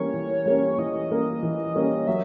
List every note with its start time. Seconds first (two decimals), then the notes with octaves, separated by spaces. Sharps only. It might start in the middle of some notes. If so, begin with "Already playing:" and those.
Already playing: E3 G3 A#3 C#4 C#5
0.14 E3
0.46 G3 A#3 C#4
0.78 E3 D#5
1.11 G3 A#3 C#4
1.43 E3
1.76 G3 A#3 C#4
2.08 F#3 E5